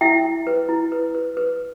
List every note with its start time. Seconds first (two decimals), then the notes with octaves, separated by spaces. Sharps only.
0.01 E4 E5 G5
0.25 E4
0.47 B4
0.69 E4
0.92 B4
1.15 B4
1.37 B4